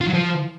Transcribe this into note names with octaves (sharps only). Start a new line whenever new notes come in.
F4
F#3
F3